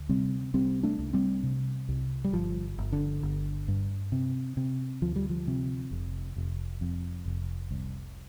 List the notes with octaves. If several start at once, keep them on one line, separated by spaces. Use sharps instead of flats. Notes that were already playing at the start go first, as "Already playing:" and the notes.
Already playing: D2
C3 G3 C4
C2 G3 C4
A3 D4
C2
G3 C4
C3
C2
G3
G1 F3
G1
D3
G1
G2
C3
C3
D2 F3
G3
F3
C3
F1
F1
F2
F1
C2